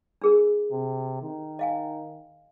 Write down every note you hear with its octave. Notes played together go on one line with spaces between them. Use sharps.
D4 G#4 A#4
C3
D#3
D#5 F5 G#5